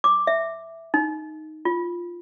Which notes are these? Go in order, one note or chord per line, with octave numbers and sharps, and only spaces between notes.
D6
E5
D#4
F4